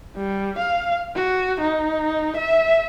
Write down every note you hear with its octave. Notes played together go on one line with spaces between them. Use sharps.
G3
F5
F#4
D#4
E5